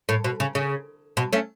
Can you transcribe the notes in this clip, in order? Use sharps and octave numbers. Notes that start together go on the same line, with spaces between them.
A2
B2
C#3
C#3
B2
A3 C#4